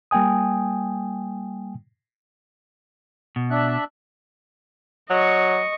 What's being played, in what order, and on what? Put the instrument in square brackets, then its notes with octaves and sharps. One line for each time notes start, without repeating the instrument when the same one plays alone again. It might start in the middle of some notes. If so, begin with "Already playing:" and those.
[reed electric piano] G3 A#3 G5 G#5 D#6
[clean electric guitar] B2
[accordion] D4 E5 F#6
[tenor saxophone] F#3 [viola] D#5 C#6